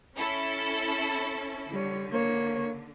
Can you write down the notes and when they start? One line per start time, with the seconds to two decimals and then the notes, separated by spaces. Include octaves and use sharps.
0.17 C#4 E4 A4
1.72 D3 G3 C#5
2.12 A#3 C#5